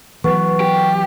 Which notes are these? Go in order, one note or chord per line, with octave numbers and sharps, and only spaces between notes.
E3 F#3 B3 C#6
G4